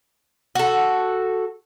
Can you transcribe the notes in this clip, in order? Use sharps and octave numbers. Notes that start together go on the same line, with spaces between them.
F#4 A4